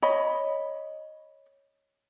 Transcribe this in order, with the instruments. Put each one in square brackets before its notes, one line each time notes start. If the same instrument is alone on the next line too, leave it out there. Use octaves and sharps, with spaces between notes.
[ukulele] C#5 D#5 B5